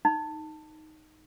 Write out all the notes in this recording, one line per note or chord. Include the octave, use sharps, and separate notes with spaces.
D#4